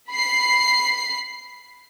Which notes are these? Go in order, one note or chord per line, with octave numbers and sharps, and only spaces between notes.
B5 C7